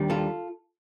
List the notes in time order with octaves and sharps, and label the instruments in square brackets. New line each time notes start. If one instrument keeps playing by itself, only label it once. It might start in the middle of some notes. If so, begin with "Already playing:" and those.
Already playing: [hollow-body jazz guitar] D#2 D#3 G3 D4
F4 A4